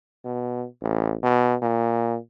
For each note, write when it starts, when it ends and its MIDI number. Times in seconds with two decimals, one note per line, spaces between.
0.25 0.65 47
0.82 1.15 33
1.23 1.55 47
1.62 2.16 46